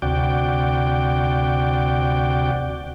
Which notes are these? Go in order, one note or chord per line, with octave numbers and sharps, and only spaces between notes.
D2 C3 F#4 D5 G5